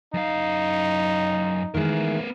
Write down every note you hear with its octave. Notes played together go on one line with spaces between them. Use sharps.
F#2 D#4 F5
D#3 E3 G#3 B3 A#4